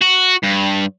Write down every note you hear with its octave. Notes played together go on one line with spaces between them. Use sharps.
F#4
G2